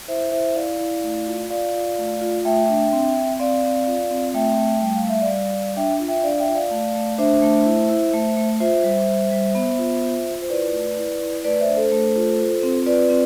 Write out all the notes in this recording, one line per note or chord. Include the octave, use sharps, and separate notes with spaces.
E4 C5 E5
E4 C5 E5
E4 D5 F5
E4
A3
F4
F4 D5 F5
F4
A3
F4
A3 E5 G5
D4
C4
C4
C4 D5 F5
C4
F4
C4
A3 E5 G5
A3
G3 G5
F5
G3 E5
D5 F5
G3
G3
D4 E5 G5
F4
E5 G5
D4 D5 F5
E5 G5
F4
D5 F5
A3
A3
D4 C5 E5
A3
E4
E4
A3
A3
F4 C5 E5
G3
G3
G3
B3
F4
F4
F4
C5
E4 B4 D5
A3
E4
E4
A3 B4 D5
D5
C5 E5
D4
A4 C5
A3
F4
F4
C4
F4 B4 D5
C4